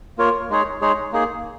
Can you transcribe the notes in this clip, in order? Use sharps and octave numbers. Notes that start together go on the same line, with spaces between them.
A#3 F4 A#4 C#5
G#3 D#4 G#4 C#5
G#3 D#4 G#4 C#5
A#3 D#4 G#4